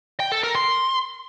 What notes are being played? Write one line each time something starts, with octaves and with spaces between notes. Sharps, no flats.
G5
A4
A#4
C6